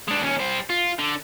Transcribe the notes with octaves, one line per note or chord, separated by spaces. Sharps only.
G#3 D4
D#2 C#4
G3 C5
F4
D3